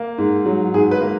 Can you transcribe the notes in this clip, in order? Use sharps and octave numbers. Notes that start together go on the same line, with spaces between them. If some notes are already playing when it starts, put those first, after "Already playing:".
Already playing: A#3
G#2
F#3
G#2 G#4
B4
A#3